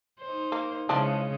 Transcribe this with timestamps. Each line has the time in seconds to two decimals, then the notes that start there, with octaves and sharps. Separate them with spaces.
0.21 D#4 C5
0.52 A#3
0.89 C#3 E3 F3 G#3 D4